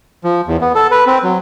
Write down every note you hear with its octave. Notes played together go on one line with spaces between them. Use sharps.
F3
E2
B3
A4
B4
C4
F#3